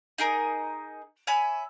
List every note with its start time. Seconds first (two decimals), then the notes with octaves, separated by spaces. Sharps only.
0.18 D#4 G#4 A#4 D#5
1.27 C#5 E5 G#5 B5